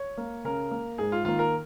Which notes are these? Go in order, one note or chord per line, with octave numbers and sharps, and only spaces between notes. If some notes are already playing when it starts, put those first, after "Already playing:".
Already playing: C#5
A#3
C#3 A#4
A#3
G#2 G#4
F4
D#3 A#3 F4
A#4